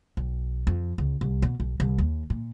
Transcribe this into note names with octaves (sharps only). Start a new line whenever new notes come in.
B1
F2
C#2
C2
B2
B1
C2
D#2
A#2